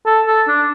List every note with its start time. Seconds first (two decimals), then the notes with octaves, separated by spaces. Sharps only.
0.06 A4
0.27 A4
0.48 D4